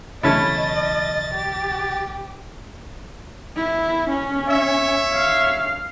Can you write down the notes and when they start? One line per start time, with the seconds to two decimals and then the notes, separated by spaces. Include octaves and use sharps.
0.23 B1 C#3 E3 A3 C#4 E4 D#5 A6
1.34 G4
3.56 E4
4.10 C#4
4.48 C#5 E5
5.13 F5